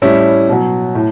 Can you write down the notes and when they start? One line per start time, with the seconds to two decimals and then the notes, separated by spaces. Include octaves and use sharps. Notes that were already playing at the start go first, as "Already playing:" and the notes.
0.02 A2 G3 C#4 E4
0.49 B2 F#3
0.95 A2